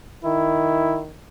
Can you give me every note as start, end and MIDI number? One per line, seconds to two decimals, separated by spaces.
0.25 1.13 51
0.25 1.02 64